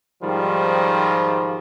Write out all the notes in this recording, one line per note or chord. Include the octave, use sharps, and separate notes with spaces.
G#2 D#3 F3 G3